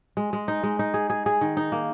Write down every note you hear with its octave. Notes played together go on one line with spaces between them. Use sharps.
G#3
G#3
D#4
G#3
D#4
G#4
G#4
G#4
D#3
D#4
A#3